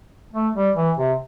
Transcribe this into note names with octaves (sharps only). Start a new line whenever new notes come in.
A3
G3
E3
C3